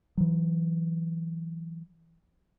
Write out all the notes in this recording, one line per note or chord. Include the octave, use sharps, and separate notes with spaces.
E3 F#3